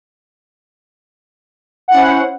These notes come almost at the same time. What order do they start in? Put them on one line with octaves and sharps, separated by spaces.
F#5 E4 C#4 C5